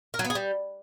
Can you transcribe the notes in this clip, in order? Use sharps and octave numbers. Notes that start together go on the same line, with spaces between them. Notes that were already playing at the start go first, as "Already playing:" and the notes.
A#4
F#3
B3
G#4
G3